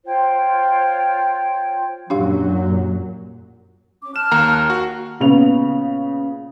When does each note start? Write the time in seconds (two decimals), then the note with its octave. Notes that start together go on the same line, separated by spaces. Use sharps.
0.05 F4 C5 C#5 G5
2.10 F#2 A#2 F#3 D4 G4 F5
4.03 C#4 D6
4.16 A5 F6 F#6 E7
4.32 D#2 A#3 A#5
4.70 F#4
5.20 A#2 C#3 B3 F7